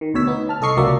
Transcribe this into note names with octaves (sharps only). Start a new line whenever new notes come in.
D#3
D2 B2 C#5 E6 B6
B3 D#4
A5 F6
C2 A4 D#5 C#6 C7
C#2 F#3 A#3 D5 E5 A#5